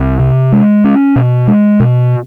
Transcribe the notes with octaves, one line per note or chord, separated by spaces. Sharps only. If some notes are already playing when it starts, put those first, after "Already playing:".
Already playing: C2
C3
G#3
C#4
B2
G#3
B2